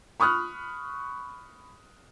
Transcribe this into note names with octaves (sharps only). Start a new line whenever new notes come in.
B5 C#6 D#6 F6 F#6